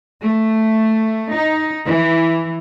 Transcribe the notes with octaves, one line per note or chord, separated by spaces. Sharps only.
A3
D#4
E3